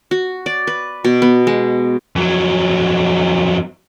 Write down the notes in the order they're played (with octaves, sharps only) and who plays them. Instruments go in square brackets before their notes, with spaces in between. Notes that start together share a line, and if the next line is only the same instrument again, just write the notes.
[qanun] F#4
D5
B4
B2
B3
G#3
[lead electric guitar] F2 F#3